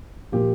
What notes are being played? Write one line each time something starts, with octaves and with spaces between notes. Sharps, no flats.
A#2 F3 G4